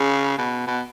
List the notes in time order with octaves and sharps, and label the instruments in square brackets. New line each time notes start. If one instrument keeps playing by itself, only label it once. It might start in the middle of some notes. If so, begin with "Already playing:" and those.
Already playing: [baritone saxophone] C#3
B2
B2